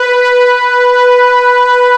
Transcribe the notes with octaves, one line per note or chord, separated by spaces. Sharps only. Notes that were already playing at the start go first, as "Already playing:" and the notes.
Already playing: B4